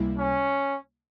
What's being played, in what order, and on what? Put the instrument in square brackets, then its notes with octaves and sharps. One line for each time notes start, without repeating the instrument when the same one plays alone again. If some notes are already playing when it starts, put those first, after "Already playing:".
Already playing: [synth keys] C#2 C3 G3 A#3 E4
[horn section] C#4